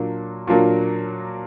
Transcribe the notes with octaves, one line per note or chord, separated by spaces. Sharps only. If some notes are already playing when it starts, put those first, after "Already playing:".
Already playing: A#2 F#3 A#3 D4
A#2 F#3 A#3 D4